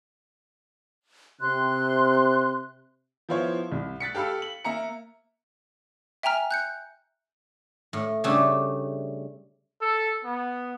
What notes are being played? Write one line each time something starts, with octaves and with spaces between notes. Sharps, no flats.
C3 C6 F#6
F3 B3 E4 F4 C5 C#5
C2
F#6 A6 B6 C#7
G4 A4 F5 B5 E6
F#7
A#3 E5 A#5 C#7
E5 G5 G#5 A#5 F6
F#6 G6 C#7
A2
C#3 G3 A3 D4 E4
A4
B3